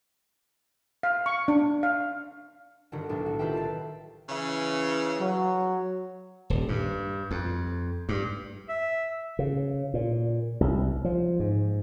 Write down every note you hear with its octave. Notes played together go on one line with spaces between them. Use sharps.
F5
C#6
D4
F5
G1 D3 D#3 F#4
B1 A2 D4
F#4
D#3 F4 G4 B4 E5 G5
A5 C7
C#3 E3
F#3
D#1
G2
F2
G2
E5
C#3
A#2
C2
F3
G#2